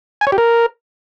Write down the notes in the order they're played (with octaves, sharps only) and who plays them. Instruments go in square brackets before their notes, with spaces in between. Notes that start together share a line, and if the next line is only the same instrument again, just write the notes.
[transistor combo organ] G#5
C#5
G4
A#4